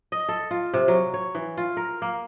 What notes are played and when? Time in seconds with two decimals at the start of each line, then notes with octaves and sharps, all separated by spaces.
0.12 D#5
0.29 A4
0.51 F4
0.74 C3
0.88 F#3
1.14 C#5
1.35 E3
1.57 F4
1.77 A#4
2.02 A#3